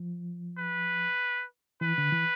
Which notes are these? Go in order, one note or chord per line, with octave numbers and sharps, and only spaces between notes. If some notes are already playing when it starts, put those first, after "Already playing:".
Already playing: F3
B4
E3 B4
D3
E3